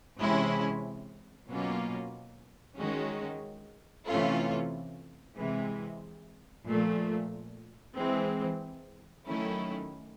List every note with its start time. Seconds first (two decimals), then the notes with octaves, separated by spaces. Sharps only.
0.18 C3 E3 G#3 C#4 E4
1.47 B2 F#3 A#3 C#4 F4
2.78 D#3 G#3 C#4 F#4
4.07 C3 E3 A3 C#4 F4
5.37 C3 E3 G#3
6.67 A#2 F3 A3
7.97 E3 G#3 C4
9.27 D#3 F#3 A3 C#4 E4